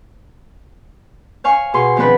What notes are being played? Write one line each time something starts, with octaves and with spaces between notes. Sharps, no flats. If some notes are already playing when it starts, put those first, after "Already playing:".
C#5 F5 G#5 C#6
B2 G#4 C6 C#6
D#3 F3 B3 C4 D4 B4